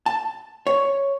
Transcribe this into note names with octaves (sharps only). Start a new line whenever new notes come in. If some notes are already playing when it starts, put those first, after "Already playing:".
A5
C#5